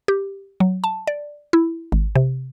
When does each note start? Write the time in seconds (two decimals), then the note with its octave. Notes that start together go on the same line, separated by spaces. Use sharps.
0.08 G4
0.60 F#3
0.84 A5
1.07 D5
1.53 E4
1.92 G#1
2.16 C3